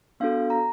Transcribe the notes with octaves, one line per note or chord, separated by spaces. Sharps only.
B3 D4 F#4 A4 F5
A#5